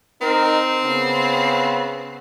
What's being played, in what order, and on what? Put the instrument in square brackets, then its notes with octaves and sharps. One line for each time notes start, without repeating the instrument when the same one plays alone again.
[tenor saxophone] C4 [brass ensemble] D#4 A#4
[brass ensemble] C#3 B3